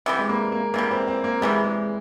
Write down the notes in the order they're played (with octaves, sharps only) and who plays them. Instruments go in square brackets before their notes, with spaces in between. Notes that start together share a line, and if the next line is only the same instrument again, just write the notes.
[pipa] C3 E3 G3
[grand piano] G#3
A#3
A#3
[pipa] C3 E3 G3 [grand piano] A#3
[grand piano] C4
C4
A#3
[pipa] C3 E3 G3 [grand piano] G#3
[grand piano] G#3